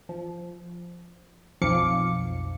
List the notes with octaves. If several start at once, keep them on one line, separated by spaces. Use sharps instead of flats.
F3
B1 F2 F3 F5 D6 C#7